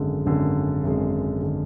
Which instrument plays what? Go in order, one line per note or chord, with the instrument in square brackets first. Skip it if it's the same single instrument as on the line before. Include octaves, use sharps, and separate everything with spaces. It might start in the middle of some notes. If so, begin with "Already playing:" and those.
Already playing: [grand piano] G#1 F#2 D3 G#3
G#1 F#2 D3 G#3
G#1 F#2 D3 G#3
D3 G#3